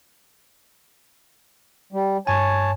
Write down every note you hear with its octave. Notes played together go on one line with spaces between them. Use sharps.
G3
G2 C#5 G#5 A5